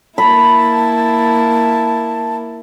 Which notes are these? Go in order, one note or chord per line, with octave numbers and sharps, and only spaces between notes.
A#3 E4 A5 B5